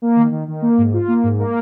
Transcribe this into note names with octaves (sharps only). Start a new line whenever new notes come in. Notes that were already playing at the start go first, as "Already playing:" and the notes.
A#3
D#3
D#3
D#3
A#3
G#2
F4
A#3
G#2
A#3